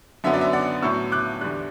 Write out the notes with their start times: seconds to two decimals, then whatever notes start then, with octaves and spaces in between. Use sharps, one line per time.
0.24 F#2 D3 F#3 B3 E5
0.33 D5
0.41 E5
0.53 D5 F#5
0.82 A2 F#3 B3 C#6 E6
1.12 D6 F#6
1.41 E2 D3 G3 F#6